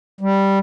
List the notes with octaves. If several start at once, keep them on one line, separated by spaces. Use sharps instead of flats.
G3